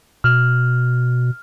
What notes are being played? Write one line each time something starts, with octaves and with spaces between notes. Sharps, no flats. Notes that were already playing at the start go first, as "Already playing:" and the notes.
B2 F6